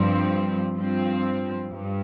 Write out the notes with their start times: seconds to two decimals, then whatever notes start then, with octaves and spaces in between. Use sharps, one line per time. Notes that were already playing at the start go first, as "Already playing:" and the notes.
Already playing: G2 F3 C4
0.77 G2 F3 C4
1.72 G2